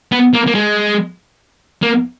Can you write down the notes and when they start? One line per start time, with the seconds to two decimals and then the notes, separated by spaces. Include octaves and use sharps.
0.12 B3
0.34 A#3
0.47 A#3
0.55 G#3
1.82 A#3